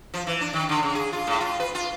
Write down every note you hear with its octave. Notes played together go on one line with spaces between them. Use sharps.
F3
E3
D4
D#3
D3
C#3
G#4
F4
A2
F4
B4
F4